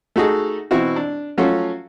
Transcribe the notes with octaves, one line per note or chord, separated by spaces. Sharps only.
A3 D#4 F#4 G#4 A4
B2 E3 C4 E4 F#4
D4
F3 F#3 A3 C#4 F4 F#4